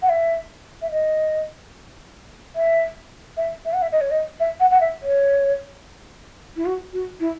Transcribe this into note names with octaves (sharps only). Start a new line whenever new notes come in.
F#5
E5
E5
D#5
E5
E5
E5
F#5
E5
D#5
C#5
D#5
E5
F#5
F#5
E5
C#5
E4
F#4
F#4
E4